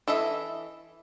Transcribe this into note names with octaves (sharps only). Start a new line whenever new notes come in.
E3 A4 D#5 E5